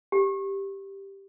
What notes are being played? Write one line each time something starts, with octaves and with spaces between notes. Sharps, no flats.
G4